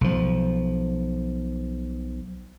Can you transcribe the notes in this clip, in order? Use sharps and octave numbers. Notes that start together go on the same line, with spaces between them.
B1 F3